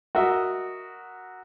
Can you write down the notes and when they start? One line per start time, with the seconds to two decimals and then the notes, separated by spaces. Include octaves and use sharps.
0.15 F#4 A#4 D#5 E5